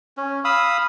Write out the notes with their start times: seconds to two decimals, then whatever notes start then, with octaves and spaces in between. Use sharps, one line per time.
0.17 C#4
0.45 F5 B5 D#6 E6